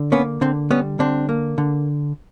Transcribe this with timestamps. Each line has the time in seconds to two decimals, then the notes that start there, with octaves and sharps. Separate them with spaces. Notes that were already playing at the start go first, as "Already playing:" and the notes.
Already playing: D3
0.12 A#3 B3 C#4
0.41 D3 C4
0.71 G3 B3 C#4
0.99 D3 C4 D4
1.29 A#3
1.58 D3